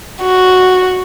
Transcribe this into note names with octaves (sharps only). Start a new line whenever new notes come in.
F#4